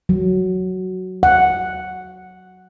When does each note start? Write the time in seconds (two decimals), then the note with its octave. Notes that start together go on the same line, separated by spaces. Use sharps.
0.09 F#3
1.23 F#5